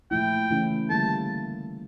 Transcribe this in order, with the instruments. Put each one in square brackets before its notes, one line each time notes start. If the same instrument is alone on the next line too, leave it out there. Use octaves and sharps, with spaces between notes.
[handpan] A#2 F3 A3 E4 [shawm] G5
[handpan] C#3 E3 A3 C#4 E4
[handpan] D3 G3 A#3 E4 A4 [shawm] A5